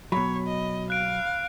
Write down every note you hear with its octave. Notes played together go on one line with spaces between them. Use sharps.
B2 F#3 C#5 B5
D#5
F5 F#6 D7